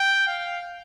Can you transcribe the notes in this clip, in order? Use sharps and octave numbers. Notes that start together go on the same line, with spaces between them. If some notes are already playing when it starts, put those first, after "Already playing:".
Already playing: G5
F5